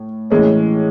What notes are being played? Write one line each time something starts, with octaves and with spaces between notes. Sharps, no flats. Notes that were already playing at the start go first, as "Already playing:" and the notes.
Already playing: A2
A2 E3 G#3 C#4